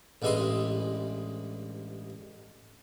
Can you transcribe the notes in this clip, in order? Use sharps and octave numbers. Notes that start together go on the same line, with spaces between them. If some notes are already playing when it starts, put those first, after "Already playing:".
A1 G2 G#3 E4 D#5 C6